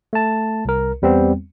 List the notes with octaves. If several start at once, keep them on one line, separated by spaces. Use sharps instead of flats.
A3 A5
C2 A#4
E2 G3 B3 C4